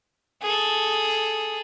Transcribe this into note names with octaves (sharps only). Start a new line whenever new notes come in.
G#4 A4